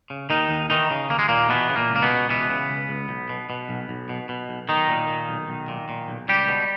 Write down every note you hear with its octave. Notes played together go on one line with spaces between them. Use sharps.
C#3
D#2 D#3 D#4
D#2
D#3 E3 D#4
C#3
D#2 A#3
G#3
D#2 A#2 A#3
B2 E3 B3
C#3
A#2 A#3
C#2
A#3
B2 B3
C#2
B2 E3 B3
C#3
C#2
C#2
B1
B2
B2
B1
B1
B2
B2
B1
B1 D#3 D#4
A#2
A#2
B1
B1
A#2
A#2
B1
C#2 G3 G4
B2